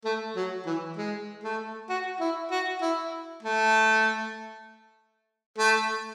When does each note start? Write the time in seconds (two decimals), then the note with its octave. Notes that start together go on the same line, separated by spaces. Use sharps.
0.05 A3
0.36 F#3
0.66 E3
0.97 G#3
1.43 A3
1.89 F#4
2.20 E4
2.51 F#4
2.82 E4
3.43 A3
5.58 A3